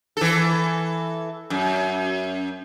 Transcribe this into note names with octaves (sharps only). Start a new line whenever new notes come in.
E3 A4
F#2